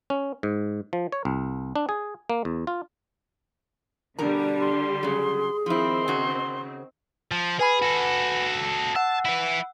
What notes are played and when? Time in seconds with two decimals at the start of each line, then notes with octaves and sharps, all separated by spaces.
0.10 C#4
0.43 G#2
0.93 F3
1.12 C#5
1.25 C2
1.76 D4
1.89 G#4
2.30 A#3
2.45 E2
2.67 F4
4.19 B2 D3 G3 D4 A#4 A#5
4.61 C6
5.03 C#3 F#3 G#4
5.66 D#3 F3 C4 E4 C6
6.08 C#3 F#4
7.31 F3
7.59 G#4 B4 G#5 B5
7.82 F#4 A4
8.96 F#5 A5 E6
9.25 E4 B4